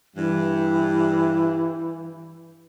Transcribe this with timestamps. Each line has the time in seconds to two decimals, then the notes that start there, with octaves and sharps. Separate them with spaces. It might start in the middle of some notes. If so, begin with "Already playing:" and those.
0.15 G2 E3